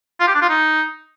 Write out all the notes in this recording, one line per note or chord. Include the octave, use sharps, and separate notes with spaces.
F4
G4
D4
F4
D#4